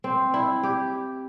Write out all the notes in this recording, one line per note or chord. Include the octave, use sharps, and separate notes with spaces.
C4
E4
G4